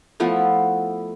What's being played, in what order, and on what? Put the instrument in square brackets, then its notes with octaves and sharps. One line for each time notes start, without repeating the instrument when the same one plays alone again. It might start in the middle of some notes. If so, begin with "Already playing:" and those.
[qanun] F3 A3 B3 E4